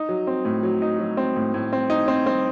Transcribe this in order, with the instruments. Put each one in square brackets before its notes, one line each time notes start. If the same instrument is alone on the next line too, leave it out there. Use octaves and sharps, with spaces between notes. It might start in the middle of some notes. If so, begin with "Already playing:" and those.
Already playing: [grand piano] D#4
F#3
C4
A2
F#3
D#4
F#3
C4
A2
A2
C4
D#4
C4
C4